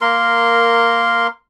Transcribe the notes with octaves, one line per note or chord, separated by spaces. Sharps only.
A#3 A#4 C6